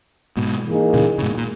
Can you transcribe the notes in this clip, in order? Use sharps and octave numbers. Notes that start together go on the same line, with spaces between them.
G#2 B2
E3 A#3 D#4 G#4
A#2 C#3
C#3
G#2 B2
A#2